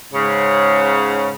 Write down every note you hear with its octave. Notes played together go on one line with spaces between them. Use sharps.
G#2 C#3